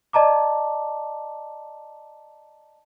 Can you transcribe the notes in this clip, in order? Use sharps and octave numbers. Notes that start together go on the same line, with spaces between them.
D5 D#5 A5 A#5 D6